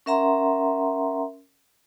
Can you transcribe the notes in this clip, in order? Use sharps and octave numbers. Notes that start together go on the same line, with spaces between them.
C#4 A#4 E5 F#5 A#5 C6